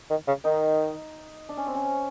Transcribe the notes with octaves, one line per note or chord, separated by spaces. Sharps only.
D#3
C#3
D#3 D#4
D4
C#4
C4
C#4